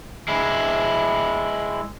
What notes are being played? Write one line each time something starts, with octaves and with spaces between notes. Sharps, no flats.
G#3 E4